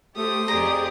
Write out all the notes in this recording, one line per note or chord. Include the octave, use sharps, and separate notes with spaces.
A3 G4 C5 D#6
F2 G4 G#4 D5 A#5